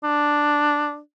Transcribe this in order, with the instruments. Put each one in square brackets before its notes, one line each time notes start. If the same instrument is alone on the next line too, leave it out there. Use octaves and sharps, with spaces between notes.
[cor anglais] D4